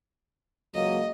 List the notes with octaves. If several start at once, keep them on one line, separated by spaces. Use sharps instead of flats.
C#2 F#3 A#3 D#5